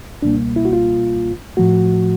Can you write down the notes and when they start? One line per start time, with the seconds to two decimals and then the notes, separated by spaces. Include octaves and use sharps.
0.22 C#2 B2 G3 A#3 D4
0.56 E4
0.65 F#4
0.73 F4
1.57 A2 F3 A3 F#4